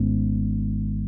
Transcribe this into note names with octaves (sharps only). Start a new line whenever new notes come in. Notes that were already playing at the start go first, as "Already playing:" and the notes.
Already playing: G#1 G#2 B3 C#4